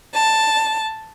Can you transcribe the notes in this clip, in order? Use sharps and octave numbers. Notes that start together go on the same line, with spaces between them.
A5